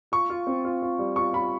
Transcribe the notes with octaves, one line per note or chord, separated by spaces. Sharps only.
F4 C#6
F4
C4
F4
F4
G3
F4 C#6
F4 B5